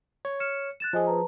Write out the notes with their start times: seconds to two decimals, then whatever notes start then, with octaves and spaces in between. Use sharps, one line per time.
0.25 C#5
0.40 F6 C#7 E7
0.80 F#6 A6 E7
0.93 F3 G#4 C5 D#5 G#5
1.07 B4 A5 A#5